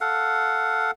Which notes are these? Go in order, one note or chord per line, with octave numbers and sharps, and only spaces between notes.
A4 F5 F#5